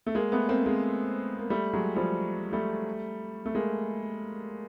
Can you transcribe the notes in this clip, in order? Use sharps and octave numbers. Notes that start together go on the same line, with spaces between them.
A3
G#3 A#3
A3 B3
A#3 C4
G#3 A#3
A#3
G3 A3
F#3 G#3
F3 G3
G3 A3
A3
G#3 A#3